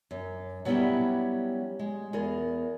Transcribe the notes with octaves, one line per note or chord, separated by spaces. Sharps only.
F#2
F#3 G3 B3 C#4 E4 G4
G#3
E2 G#4 A#4